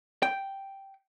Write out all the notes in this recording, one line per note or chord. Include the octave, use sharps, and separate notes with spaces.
G5